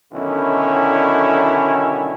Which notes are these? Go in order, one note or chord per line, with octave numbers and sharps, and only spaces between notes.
B1 D3 D#3 C#4 E4